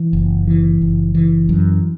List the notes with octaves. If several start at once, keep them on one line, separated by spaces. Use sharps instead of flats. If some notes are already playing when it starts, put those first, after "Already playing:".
Already playing: E3
F#1
E3
F#1
E3
F#2